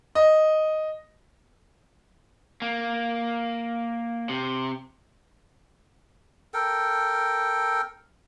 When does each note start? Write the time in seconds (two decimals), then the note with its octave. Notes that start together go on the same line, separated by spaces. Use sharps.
0.15 D#5
2.62 A#3
4.29 C3
6.54 A4 A#4 G5